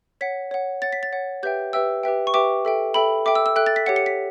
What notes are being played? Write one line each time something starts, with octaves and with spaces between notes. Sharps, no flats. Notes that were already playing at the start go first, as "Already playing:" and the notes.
C#5 F#5 B6
C#5 F#5
C#5 F#5 A6
B6
A6
C#5 F#5
G4 B4 E5 G5 G6
G4 B4 E5 G5 E6
G4 B4 E5 G5
C#6
G4 B4 E5 G5 D6
A4 E5 G5
A4 E5 G5 B5
A4 E5 G5 D6
E6
E6
A4 E5 G5 F#6
A6
B6
G4 C#5 F#5 C#7
C#7
B6